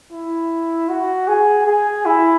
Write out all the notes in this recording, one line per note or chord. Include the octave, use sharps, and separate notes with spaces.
E4
F#4
G#4
G#4
E4